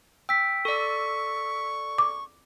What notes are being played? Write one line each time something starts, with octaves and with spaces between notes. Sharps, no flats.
G5 E6 B6
A4 D5 C#6
D6